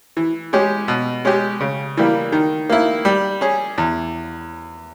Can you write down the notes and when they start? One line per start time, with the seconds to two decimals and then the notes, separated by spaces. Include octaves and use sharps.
0.17 E3
0.53 G#3 C#4 G4
0.88 B2
1.25 G#3 C#4 G4
1.60 C#3
1.97 E3 G3 A#3
2.32 D#3
2.70 A#3 E4
3.05 G3
3.41 C#4 G#4
3.78 E2